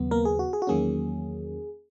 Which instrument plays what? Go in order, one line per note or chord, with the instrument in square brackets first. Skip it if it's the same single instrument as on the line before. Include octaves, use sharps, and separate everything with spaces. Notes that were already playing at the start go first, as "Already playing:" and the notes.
Already playing: [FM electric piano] D#2 C#3 F#3 B3
A#3 A#4
G#4
F#4
G#4
F#4
E2 D#3 F#3 A#3 C#4 G#4